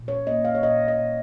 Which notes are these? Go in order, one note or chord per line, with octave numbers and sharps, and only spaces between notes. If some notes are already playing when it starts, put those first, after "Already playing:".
Already playing: A#2
C#5
A#3 D#5
F5
C#5
A#2 D#5
D#5
A#2